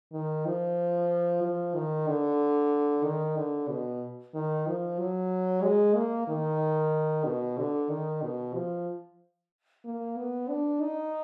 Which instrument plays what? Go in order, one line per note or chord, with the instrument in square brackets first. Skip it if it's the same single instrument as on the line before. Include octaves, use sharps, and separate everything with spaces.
[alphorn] D#3
F3
F3
D#3
D3
D#3
D3
B2
D#3
F3
F#3
G#3
A#3
D#3
B2
D3
D#3
B2
F3
A#3
B3
D4
D#4